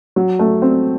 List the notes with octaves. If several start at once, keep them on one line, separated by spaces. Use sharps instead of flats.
F#3
A3
C4